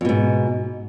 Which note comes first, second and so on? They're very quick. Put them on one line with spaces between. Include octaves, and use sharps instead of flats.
F2 B2 G#2